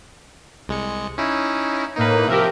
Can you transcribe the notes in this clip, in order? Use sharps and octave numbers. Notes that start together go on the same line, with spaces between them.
C2 G#3 C#7
C#4 D#4 E4
A2 A#3 D#4 B4
C3 F3 G4 A#4 E5